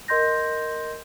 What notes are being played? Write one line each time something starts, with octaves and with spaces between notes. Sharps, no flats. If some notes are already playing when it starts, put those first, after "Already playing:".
A#4 D#5 C6 G6 A#6